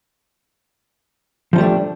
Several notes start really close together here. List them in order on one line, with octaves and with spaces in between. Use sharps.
F3 D#4 G3 A3 D4